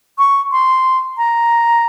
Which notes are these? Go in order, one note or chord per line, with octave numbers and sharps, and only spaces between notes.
C#6
C6
A#5